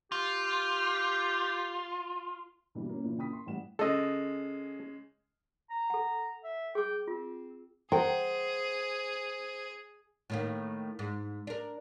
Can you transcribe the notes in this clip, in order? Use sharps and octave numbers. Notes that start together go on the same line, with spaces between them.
F4 G4
B2 D3 E3 G3
A#3 C#4
A#2 E3 F3 D4
C#3 A#3 G5 B5 D#6 B6
C6
A1 A2 G3 F#5 E7
C#3 G#3 A4 D#5
A#5
A4 F#5
E5
G#4 G5 D6
C4 F4
G#4 A#4 C5 F#5 G5
A2 D#3 A#3
G#2
D4 A#4